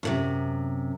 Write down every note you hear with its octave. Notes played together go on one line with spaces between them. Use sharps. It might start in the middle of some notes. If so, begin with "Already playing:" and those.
F#2 A2 C3